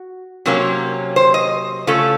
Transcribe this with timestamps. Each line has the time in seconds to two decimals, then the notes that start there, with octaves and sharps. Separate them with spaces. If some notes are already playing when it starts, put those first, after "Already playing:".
Already playing: F#4
0.46 C3 F#3 A#3 C#4
1.16 C5
1.34 D#5
1.87 C#3 A3 C#4 F4 A4